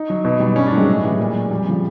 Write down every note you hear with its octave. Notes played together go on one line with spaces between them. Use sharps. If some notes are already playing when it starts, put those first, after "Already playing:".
Already playing: D#4
F#3
B2 D#4
G3
G2 C#4
D4
D#3 F#3 G#3
A2
E3 G3
A#2
F#3
F2 G3
C#3 F3